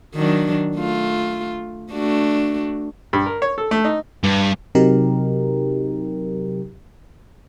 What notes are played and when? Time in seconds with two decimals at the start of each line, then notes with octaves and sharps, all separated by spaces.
0.15 D#3 F#3 D4
0.77 A3 F4
1.91 A3 D4 F#4
3.13 G2
3.26 A#4
3.42 C#5
3.58 A4
3.71 A3
3.85 D#4
4.23 G2
4.75 C3 F#3 D#4 G4 A#4